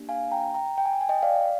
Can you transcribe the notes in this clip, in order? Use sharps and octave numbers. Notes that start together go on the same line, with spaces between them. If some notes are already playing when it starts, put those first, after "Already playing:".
Already playing: A#3 D4 G4
F5 G#5
G5 A#5
G5 A#5
G5
G#5
G5
G#5
D#5 G5
D5 F5